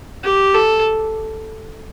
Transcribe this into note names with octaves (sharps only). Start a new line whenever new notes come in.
G4
A4